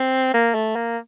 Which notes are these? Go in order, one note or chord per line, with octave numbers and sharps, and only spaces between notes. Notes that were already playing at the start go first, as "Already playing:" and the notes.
Already playing: C4
A#3
A3
A#3